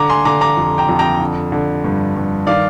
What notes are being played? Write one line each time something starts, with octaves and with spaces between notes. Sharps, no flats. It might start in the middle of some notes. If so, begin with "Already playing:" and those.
Already playing: D3 A#5 D6
G#5 C6
D3 A#5 D6
A#5 D6
F2
G5 A#5
F2
G5 A#5
D3
D3
G2
G2
D#3 D5 F5